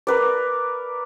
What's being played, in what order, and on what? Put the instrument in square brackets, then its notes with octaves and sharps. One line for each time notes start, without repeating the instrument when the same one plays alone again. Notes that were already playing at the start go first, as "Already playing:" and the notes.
[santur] A#4 B4 D5